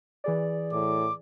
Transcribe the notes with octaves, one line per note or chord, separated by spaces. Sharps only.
E3 G#4 D5
A2 D6